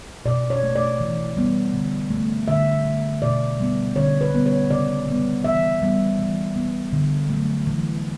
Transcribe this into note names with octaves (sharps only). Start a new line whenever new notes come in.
B2 D5
C#5
A3
D5
E3
G3 B3
D3
A3
D3 E5
A3
B2 D5
G3 B3
D3 C#5
B4
G3 B3
C#5
C#3 D5
G3 B3
E3 E5
G3 B3
E3
B3
D3
F#3 A3
E3